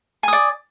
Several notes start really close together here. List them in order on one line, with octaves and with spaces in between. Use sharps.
G#5 D#6 D5